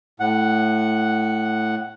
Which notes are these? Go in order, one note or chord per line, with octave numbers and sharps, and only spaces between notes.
A2 F#5